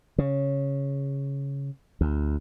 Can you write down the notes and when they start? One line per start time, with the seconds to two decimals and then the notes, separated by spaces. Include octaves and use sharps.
0.18 C#3
2.01 D2